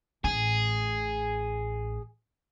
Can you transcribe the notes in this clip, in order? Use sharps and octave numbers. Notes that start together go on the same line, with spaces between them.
A1 A2 G#4